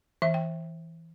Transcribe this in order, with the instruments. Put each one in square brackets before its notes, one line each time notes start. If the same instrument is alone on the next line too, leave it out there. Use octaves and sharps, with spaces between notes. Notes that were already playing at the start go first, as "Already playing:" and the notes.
[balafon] E3 E5
G5